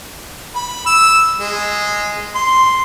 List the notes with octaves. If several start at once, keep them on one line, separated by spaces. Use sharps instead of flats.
B5
E6
G#3
C6